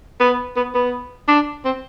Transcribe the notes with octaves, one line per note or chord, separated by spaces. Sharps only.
B3
B3
B3
D4
C4